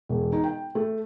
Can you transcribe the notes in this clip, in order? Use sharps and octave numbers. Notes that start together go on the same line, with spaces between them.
E1
D#4
G5
A3